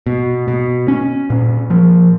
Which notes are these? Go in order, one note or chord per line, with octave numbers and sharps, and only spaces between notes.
B2
B2
C#4
A#2
F3